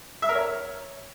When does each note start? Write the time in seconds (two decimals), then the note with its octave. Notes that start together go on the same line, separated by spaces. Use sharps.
0.22 E5
0.29 A#4
0.35 C#5